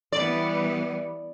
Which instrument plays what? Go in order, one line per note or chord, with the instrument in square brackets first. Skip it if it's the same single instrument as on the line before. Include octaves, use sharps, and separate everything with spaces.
[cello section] E3 G3 B3 [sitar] D5